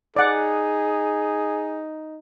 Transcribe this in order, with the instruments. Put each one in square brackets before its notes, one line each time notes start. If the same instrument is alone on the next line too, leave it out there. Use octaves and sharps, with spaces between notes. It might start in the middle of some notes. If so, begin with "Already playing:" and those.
[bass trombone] D#4 [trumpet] G#4 [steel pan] D5 F#5